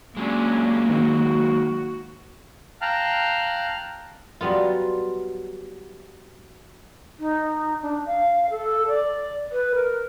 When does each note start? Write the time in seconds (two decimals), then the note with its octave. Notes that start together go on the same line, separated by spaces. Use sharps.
0.17 F#3 G#3 A#3 C#4 D4
0.89 D#3 F#4
2.82 F5 G5 A5 A#5 F6 F#6
4.41 F#3 G3 B3 F4
7.19 D#4
7.82 D4
8.06 F5
8.50 A4
8.88 D5
9.52 B4
9.75 A#4